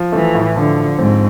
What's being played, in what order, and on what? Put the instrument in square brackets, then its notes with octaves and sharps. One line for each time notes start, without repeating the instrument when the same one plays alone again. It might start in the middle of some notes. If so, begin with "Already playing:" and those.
Already playing: [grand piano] F3
[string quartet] E3 [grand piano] A3
[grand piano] A2
[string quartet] D3 [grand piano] F3
[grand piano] F3
[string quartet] G#2 [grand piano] C4